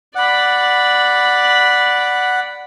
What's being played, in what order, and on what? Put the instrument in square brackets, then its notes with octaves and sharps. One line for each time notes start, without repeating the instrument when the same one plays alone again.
[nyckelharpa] D5 B5 [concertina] F#5